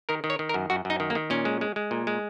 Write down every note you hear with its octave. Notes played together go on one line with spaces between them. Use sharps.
D#3 A#4
D#3
C#5
D#3
A#4
F#2
F#2 F#4
F#2 D#4
D#3
A#3
D#3
A#2 C#4
G#3
G#3
G#3
A#2
G#3